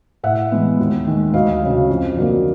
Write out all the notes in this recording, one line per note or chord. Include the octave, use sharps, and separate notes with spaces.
A2 E5 F#5
E3 G#3 B3
D#2
D#3 G#3
D2 D#5 F5
C#3 F#3
F2
D3 F#3 A#3